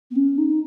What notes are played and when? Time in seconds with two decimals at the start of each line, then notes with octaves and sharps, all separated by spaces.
0.11 B3
0.16 C#4
0.38 D#4